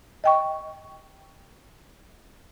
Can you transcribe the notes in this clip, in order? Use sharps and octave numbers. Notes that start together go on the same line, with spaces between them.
D#5 G5 C#6